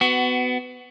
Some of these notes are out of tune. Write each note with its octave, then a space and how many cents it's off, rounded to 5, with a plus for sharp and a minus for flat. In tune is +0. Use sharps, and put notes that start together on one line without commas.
B3 +25 F#4 +15